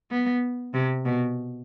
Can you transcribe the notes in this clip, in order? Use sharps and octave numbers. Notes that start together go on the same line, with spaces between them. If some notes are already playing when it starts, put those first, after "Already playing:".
B3
C3
B2